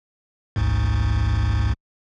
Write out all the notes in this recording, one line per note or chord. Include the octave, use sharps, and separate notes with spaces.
A1 D2 G#2